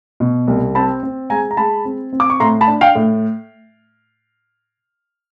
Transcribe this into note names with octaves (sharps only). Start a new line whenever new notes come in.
B2
C2
C4 A5 B5
C4
G#3 G#5 A#5
A#5
G#3 A5 B5
C4
C4
D6
C#6
A2 A#5 C6
A5 B5
D4
F5 G5
A2